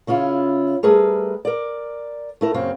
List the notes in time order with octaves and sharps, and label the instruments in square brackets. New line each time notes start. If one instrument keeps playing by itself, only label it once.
[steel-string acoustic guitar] C#3 C#4 E4 F4
G3 A3 G#4 A#4 B4
A#4 D5
A3 E4 A#4
F#2 C#3 A#3 C4